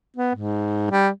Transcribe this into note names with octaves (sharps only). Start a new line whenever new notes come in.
B3
G#2
G3